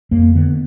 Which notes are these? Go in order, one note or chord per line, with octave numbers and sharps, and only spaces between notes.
F2 A#3
D3 B3